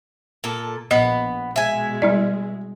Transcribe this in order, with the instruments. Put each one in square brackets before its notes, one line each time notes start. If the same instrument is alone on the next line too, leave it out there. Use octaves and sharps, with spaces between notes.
[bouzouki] A#2 A4
[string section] A#1 [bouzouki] B3 [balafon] D#5
[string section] B2 G#3 [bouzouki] E5 G#5
[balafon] G3 E4 D5